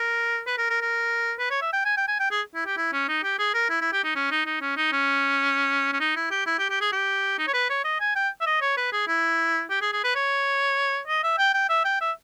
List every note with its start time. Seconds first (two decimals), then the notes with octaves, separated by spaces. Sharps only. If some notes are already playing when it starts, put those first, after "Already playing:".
Already playing: A#4
0.47 B4
0.58 A#4
0.70 A#4
0.81 A#4
1.39 B4
1.51 C#5
1.62 E5
1.73 G5
1.85 G#5
1.97 G5
2.08 G#5
2.20 G5
2.31 G#4
2.55 E4
2.66 G4
2.77 E4
2.93 C#4
3.08 D#4
3.23 G4
3.39 G#4
3.54 A#4
3.70 E4
3.81 E4
3.92 G4
4.04 D#4
4.15 C#4
4.31 D#4
4.46 D#4
4.61 C#4
4.77 D#4
4.92 C#4
5.93 C#4
6.00 D#4
6.16 E4
6.31 G4
6.46 E4
6.59 G4
6.70 G4
6.81 G#4
6.92 G4
7.39 D#4
7.47 C#5
7.54 B4
7.70 C#5
7.84 D#5
8.00 G#5
8.15 G5
8.41 E5
8.46 D#5
8.62 C#5
8.77 B4
8.92 G#4
9.07 E4
9.70 G4
9.82 G#4
9.93 G#4
10.04 B4
10.15 C#5
11.07 D#5
11.24 E5
11.38 G5
11.54 G5
11.69 E5
11.84 G5
12.01 E5